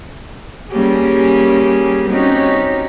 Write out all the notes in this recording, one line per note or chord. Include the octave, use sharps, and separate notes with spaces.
G3 A#3 C#4 G4 G#4
C4 C#4 D#4 F#4 G4 C#5